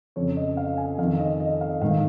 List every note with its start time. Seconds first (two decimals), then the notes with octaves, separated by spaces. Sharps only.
0.16 F2 C#3 C#5
0.36 D#5
0.57 F5
0.77 G#5
0.98 F2 F5
1.03 D#3
1.19 D#5
1.40 D#5
1.61 F5
1.82 G#2 D#3 F5